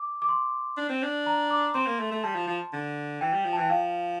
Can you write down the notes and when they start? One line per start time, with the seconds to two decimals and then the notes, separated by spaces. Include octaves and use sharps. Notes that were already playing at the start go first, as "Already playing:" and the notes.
Already playing: D6
0.22 D6
0.29 C6
0.77 D4
0.90 C4
1.02 D4
1.27 A#5
1.50 D6
1.74 C4 C6
1.87 A#3
1.99 A3
2.12 A3
2.24 G3 A5
2.35 F3
2.47 F3
2.73 D3
3.21 E3 G5
3.33 G3
3.45 F3
3.53 A5
3.58 E3 G5
3.70 F3 F5